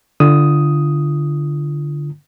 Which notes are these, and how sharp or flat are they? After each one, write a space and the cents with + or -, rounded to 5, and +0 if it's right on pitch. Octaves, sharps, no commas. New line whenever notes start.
D3 +0 F4 -30 D#6 +5